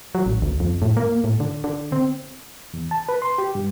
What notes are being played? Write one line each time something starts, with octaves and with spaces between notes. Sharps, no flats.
F#3
A1
D2
F2
A2
A#3
A2
D3
D3
C4
E2
A5
B4
C6
G4
G2